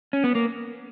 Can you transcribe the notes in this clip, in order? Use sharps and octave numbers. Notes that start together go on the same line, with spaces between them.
C#4
B3
A#3